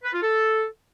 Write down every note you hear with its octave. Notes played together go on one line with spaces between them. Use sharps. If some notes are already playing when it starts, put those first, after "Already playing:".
B4
F4
A4